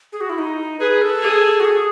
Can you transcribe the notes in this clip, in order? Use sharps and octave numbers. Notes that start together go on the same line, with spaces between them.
G#4
F#4
E4
D#4
G#4 B4
A4
G#4
F#4
G#4